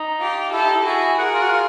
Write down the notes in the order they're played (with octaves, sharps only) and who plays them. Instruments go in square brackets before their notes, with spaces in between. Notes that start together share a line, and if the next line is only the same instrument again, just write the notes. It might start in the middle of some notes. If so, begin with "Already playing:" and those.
Already playing: [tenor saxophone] D#4
[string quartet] F4 G4
[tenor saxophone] E4 [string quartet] G4 A4
[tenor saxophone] D#4
E4
[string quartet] F#4 G#4
[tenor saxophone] F#4 [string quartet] G#4 A#4
[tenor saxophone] F4
F#4
F4